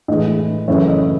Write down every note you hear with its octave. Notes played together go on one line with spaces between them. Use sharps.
A2 E3 G#3 D#5
F#2 C#3 E3 A3 C#5 E5
D#5